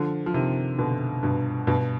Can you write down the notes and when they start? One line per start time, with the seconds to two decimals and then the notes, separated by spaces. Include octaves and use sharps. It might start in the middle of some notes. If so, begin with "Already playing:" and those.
Already playing: D3 F3
0.26 F3
0.34 C3 D#3
0.79 B2 D3
1.23 G2 B2
1.67 G2 B2